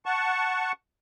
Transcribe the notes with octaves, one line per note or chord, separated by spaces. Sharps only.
F#5 A5 C#6